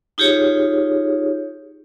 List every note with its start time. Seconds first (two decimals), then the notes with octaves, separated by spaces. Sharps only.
0.18 D#4 F4 G4 G#4 C#5